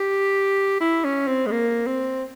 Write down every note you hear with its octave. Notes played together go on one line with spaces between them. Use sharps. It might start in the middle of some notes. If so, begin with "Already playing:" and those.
Already playing: G4
E4
C#4
C4
G#3
A#3
C4